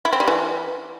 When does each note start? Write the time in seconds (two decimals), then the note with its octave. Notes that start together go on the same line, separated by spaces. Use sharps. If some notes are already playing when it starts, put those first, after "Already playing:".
0.05 E4
0.13 C4
0.20 G3
0.28 E3